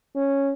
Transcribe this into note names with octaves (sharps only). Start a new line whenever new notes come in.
C#4